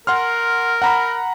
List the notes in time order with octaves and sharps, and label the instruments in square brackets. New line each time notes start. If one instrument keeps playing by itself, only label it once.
[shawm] A#4 [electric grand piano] F#5 C6 F6
[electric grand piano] F#5 A#5 B5